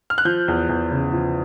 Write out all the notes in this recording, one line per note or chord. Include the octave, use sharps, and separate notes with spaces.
F6
F#6
F3 G6
E2
E2
C#3
F3